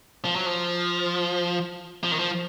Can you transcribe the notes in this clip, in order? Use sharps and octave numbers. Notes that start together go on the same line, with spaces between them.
F3
F#3
F3
F3
D#3
F3